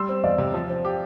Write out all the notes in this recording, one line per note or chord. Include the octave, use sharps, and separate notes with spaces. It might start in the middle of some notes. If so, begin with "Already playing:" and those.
Already playing: G3 C6 E6
C4
E2 D5 F5
C3
F3
C4
G4